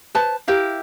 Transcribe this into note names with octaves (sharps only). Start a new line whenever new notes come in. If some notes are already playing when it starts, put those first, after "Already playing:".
B4 C5 A5
E4 G4 A#4 F5